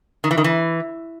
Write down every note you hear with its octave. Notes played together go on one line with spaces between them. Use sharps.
D#3
E3
D#3
E3